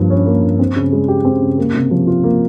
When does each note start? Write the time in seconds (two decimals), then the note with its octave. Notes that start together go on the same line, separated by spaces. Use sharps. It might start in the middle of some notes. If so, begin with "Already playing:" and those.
Already playing: G2 F3 A#3
0.10 C#4
0.26 A#3
0.43 G2
0.59 C4
0.76 C#3
0.92 G#3
1.08 G4
1.25 C4
1.42 C#3
1.58 A#3
1.74 C3
1.91 F3
2.07 F4
2.24 A#3